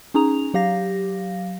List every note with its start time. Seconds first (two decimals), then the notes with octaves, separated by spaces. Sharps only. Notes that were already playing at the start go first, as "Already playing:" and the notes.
0.14 C#4 D#4 G#4 A#5 F7
0.54 F#3 G4 F5 A#6